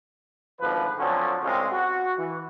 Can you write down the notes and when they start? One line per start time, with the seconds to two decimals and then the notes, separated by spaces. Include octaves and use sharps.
0.61 G#1 D2 F3 B4
0.99 D3 F3 F#3 C4 C#4
1.43 C2 G#3 C4 C#4 F4
1.73 F#4
2.19 E3